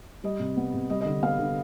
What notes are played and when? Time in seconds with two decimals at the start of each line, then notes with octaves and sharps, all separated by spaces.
0.24 G3 D#5
0.40 C3
0.57 B3
0.74 C3
0.90 G3 D#5
1.01 D3 D#5
1.23 B3 F5
1.38 D3